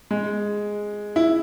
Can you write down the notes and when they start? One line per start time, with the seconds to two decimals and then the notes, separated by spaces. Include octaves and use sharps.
0.11 G#3
1.16 E4